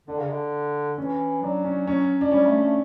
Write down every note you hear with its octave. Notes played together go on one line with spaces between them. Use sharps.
D3 D4
C#3
D3
E3 C#4
F#3 D4
C#4
C#4
D4
G3 C#4
A3
A3